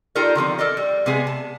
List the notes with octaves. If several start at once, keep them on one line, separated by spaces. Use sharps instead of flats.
D#4 F4 G4 A4 A#4 D5
D3 D#3 F3 C4
A4 A#4 D5 D#5
G3
C3 G#3 B3 G#4
A5